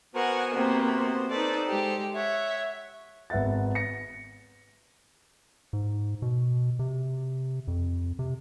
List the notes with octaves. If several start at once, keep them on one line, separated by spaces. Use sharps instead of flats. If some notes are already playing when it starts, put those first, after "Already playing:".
B3 F#4 A#4 C5 F#5 G#5
C3 A#3
D#4 A4 B4 C5 D5
G#3 G4
C#5 E5 F#5
G#1 B3 E5 F#5 A6
A#6 C#7
G#2
B2
C3
F2
C3